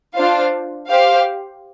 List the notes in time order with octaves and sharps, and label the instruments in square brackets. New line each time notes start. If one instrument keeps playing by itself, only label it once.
[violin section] D4 F4 C5 F5
G4 C5 F5